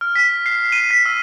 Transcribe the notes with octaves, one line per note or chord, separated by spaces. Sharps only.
F6
B6
C7
D#7
B6
E6